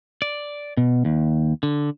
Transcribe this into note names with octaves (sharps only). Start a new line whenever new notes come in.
D5
B2
D#2
D3